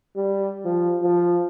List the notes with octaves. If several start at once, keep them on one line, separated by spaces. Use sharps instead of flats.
G3
F3
F3